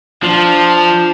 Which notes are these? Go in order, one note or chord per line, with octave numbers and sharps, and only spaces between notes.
F3 D4